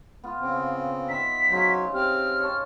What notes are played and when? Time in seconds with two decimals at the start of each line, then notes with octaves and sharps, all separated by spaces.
0.24 B3 F4
0.40 C#3 C4
1.09 D#4 E5 B6
1.49 C#3 F#3 C5
1.94 C4 G4 F6
2.40 C#5 A5